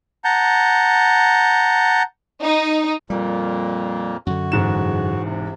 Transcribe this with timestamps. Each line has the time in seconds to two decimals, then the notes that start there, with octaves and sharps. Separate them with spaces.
0.24 F#5 A5 A#5 G6
2.43 D#4
3.10 F2 A#2 G3 A#3
4.27 F#2 D3 F#4
4.52 E1 G#2 E7
5.25 C3